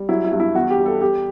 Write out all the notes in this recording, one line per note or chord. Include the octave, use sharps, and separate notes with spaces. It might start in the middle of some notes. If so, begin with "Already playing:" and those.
Already playing: G3
F#3 E4
E4
G2
E4
E2 F#4
G4
G3
A4
G3 G4